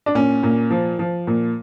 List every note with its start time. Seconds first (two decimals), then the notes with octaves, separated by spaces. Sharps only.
0.06 D4
0.15 A#2 C#4
0.43 A#2
0.71 F3
0.99 F3
1.27 A#2